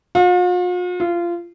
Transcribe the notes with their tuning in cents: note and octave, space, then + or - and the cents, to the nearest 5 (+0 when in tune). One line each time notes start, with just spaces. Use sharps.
F4 +45
F4 -20